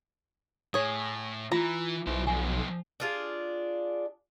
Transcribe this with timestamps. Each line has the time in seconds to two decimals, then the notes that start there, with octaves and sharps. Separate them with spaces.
0.74 A2 G#4 C#5
1.52 E3 F4 A#5 B5
2.07 B1 E4 C5
2.27 F3 B3 G#5
3.00 D4 F4 G#4